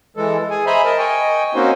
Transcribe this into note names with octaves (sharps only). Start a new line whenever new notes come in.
E3 G#3 A4
G#4 G#5
C5 D#5 E5 G#5 A#5 B5
A#4 D#5 A5
D#5 G5 G#5 C#6
A#3 C4 C#4 D#4 F#4 C5